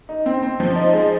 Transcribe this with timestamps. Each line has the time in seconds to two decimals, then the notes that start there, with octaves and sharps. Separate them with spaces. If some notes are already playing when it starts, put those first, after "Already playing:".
0.09 D#4
0.26 C4
0.43 C4
0.60 F3
0.76 D#4
0.93 G#3